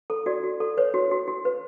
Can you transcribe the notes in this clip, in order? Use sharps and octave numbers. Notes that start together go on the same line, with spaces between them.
A4
F#4 D5
F#4
A4
B4 C#5
F#4
F#4
F#4
B4